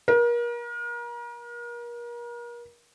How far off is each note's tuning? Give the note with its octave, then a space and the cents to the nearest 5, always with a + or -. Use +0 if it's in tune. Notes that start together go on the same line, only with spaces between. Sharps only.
A#4 +35